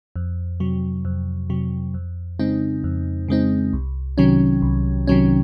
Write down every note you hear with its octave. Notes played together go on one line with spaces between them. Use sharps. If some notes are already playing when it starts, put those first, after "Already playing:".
F2
C3 F#3
F2
C3 F#3
F2
C#3 G#3 C4 D#4
F2
C#3 G#3 C4 D#4
C2
C3 D#3 F#3 C#4
C2
C3 D#3 F#3 C#4